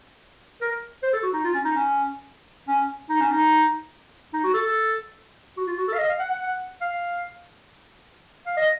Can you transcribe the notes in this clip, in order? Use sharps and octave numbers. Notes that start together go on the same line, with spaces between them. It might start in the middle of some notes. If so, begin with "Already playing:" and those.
A#4
C5
A4
F#4
D#4
F4
C#4
D#4
C#4
C#4
D#4
C#4
D#4
D#4
F#4
A4
A4
F#4
F4
F#4
A4
F5
D#5
F5
F#5
F#5
F#5
F5
F5
D#5